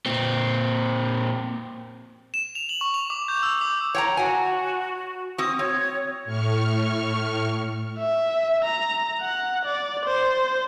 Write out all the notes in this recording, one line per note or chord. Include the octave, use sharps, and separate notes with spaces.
A#2 C4
E7
F7
F#7
C#6
F7
D6
G6
E6
D6
C#5 G5 A#5
F#4 F#5 G#5
C4 F#4 D#6
C4 C#5
A2 C#6 F6
E5
A#5
F#5
D5
C5